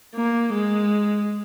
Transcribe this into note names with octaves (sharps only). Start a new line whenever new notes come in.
A#3
G#3